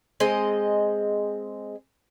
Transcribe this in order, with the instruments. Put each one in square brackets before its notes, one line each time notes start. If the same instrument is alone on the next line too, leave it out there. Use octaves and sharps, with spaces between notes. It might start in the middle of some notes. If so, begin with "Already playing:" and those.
[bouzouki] G#3 C4 D#5